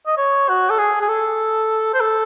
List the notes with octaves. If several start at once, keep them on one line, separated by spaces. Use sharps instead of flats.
D#5
C#5
F#4
A4
G#4
G#4
A4
C5
A4